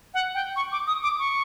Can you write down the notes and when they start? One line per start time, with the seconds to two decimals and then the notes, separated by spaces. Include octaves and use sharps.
0.14 F#5
0.35 G5
0.56 C#6
0.72 D6
0.87 D#6
1.03 D6
1.19 C#6